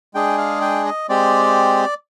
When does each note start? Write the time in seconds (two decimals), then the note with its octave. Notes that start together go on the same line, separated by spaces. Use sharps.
0.14 G#3 D4 G#4 G5
0.38 F5
0.61 G5
0.85 D#5
1.09 G#3 C4 G4 D5